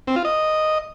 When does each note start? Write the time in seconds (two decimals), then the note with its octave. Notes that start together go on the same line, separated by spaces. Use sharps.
0.07 C4
0.16 F4
0.25 D#5